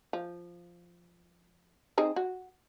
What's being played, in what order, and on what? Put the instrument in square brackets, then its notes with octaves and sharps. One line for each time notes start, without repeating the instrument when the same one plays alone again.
[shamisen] F3
C4 D#4 G#4
F#4